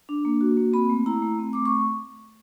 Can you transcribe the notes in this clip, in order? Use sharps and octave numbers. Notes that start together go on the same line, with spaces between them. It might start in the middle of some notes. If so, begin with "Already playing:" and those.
D4
A#3
F#4
A#3
C4 B5
A3
E4 A#5
A3
C4
A3 D6
C#6